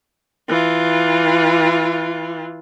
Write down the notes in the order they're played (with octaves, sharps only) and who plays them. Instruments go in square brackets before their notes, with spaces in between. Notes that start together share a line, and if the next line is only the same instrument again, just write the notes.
[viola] E3 F4